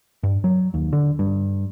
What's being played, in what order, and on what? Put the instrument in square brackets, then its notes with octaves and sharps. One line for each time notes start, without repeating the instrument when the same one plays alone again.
[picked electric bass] G2
F#3
D#2
D3
G2